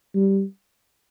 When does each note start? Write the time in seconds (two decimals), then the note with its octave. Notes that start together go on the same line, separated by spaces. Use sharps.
0.15 G3